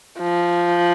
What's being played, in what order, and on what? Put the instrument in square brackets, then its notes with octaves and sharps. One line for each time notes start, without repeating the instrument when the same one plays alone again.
[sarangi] F3